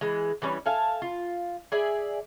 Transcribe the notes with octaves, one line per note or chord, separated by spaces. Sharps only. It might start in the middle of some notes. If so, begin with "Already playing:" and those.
E3 G#3
E3 G3 C#4
A4 E5 F5 G#5
F4
G#4 D5 E5